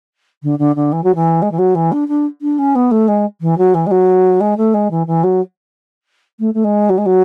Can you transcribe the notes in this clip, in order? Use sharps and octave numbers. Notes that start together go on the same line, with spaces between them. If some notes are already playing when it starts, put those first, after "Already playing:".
D3
D3
D3
E3
F#3
E3
G#3
E3
F#3
E3
D4
D4
D4
C#4
B3
A3
G#3
E3
F#3
E3
G#3
F#3
G#3
A3
G#3
E3
E3
F#3
A3
A3
G#3
F#3
G#3
F#3